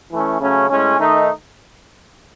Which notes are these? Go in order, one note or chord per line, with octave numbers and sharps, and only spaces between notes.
E3 A3 C#4
C#3 F#3 A3 C#4
A2 G#3 C#4
D#3 A3 D#4